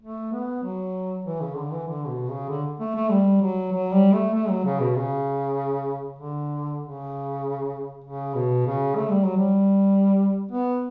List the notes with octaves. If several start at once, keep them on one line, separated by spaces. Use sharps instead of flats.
A3
B3
F#3
E3
C#3
D3
E3
D3
B2
C#3
D3
A3
A3
G3
F#3
F#3
G3
A3
A3
F#3
C#3
B2
C#3
D3
C#3
C#3
B2
C#3
A3
G3
F#3
G3
B3